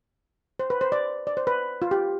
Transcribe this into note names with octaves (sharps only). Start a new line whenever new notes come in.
C5
B4
C5
D5
D5
C5
B4
F4
G4